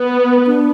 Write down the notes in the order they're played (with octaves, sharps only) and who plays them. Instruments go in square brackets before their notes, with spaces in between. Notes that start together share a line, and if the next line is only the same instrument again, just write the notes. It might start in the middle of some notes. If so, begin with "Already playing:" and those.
Already playing: [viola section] B3
[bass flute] D4